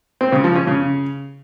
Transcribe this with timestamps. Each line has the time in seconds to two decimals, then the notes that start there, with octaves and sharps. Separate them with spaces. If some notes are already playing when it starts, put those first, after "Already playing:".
0.21 C4
0.32 C#3
0.44 F3
0.56 C#4
0.67 C#3